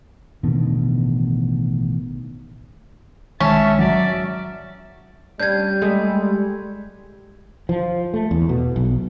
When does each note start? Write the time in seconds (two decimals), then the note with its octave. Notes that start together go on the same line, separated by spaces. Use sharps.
0.43 A1 B2 D3 D#3
3.40 B1 D#3 G#3 C#4 E5 A5
3.79 F#3 D5 E5
5.40 G3 C#4 D4 G6 G#6
5.82 G#3 A3 D#5
7.69 F3
8.14 A3
8.31 E2
8.49 B2
8.76 B1